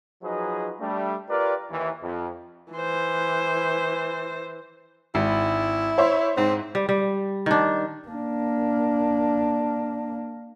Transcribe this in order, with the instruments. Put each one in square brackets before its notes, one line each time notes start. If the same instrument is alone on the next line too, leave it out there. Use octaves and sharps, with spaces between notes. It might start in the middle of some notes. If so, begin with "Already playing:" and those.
[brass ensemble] F3 F#3 D#4 G#4 B4 D#5
G3 A3 D4
F4 G4 A#4 B4 D5
D#2 E3
F2
[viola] E3 C5
[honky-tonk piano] G#1 [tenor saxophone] E4
[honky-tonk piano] C5 C#5 E5
[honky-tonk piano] G#2 [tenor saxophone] C4
[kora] G3
G3
D#3 D4
[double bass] A#3 D4